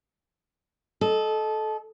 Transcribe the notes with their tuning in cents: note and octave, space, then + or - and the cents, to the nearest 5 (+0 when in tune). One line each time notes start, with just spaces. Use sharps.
A4 -20 D#5 +0